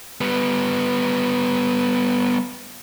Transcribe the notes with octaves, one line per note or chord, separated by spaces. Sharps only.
G3 B3